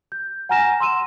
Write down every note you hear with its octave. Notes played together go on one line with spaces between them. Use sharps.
G6
F#5 G#5 A#5 F6 A#6 E7
C6 E6 D#7 E7